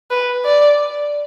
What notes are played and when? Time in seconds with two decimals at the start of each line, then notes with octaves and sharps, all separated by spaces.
0.11 B4
0.45 D5